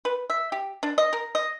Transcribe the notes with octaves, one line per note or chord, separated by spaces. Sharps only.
B4
E5
G4
D4
D#5
A#4
D#5